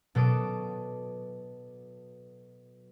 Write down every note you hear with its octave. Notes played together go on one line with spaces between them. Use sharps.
B2 F#3 A4 D6 D#6 D7